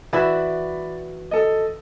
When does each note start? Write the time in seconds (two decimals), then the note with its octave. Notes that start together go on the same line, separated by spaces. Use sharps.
0.13 E3 F#4 D5 E5 B5
1.31 A4 D#5